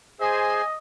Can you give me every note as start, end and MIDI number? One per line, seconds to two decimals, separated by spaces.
0.21 0.61 68
0.21 0.61 72
0.21 0.78 75
0.21 0.65 80